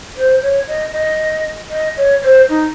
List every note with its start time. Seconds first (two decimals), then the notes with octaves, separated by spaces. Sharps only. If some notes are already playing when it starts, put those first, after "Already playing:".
0.16 C5
0.42 C#5
0.68 D#5
0.93 D#5
1.70 D#5
1.97 C#5
2.22 C5
2.49 D#4